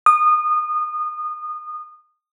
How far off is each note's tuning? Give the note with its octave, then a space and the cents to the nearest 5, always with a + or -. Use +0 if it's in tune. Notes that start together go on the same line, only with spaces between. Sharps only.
D#6 -25